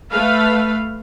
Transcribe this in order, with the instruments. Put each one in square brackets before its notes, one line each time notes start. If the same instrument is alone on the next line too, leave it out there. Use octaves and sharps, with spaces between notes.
[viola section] A3 B4 F5